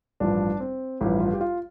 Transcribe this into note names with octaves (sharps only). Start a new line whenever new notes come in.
A1 G2 F3 D4
C4
A1 G2 F3 E4
F4
G4
F4